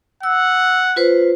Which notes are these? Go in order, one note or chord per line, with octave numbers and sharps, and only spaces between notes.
F#5 E6
F4 B4 C5